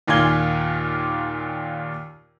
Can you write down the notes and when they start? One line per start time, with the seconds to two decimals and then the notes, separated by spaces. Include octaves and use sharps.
0.07 D#2 A#2 F4 G#5 G#6 G7